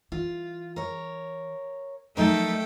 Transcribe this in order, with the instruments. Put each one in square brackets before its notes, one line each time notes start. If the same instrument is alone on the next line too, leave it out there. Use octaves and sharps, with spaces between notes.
[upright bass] E3 [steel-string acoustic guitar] F4
[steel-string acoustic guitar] A#4 C#5
[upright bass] F3 F#3 [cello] A3 [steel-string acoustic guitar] D#4 A#4 [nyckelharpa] A4 G5